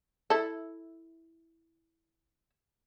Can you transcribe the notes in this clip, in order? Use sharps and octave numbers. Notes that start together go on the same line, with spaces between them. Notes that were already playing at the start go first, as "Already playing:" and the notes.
E4 A4